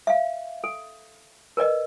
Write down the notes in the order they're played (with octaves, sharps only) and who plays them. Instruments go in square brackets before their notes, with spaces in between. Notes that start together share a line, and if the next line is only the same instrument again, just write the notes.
[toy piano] E5 F5
A4
A#4 B4 D5 D#5